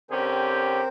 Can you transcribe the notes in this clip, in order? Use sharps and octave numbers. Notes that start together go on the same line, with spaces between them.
D3 C4 C#4 G4 A#4 C5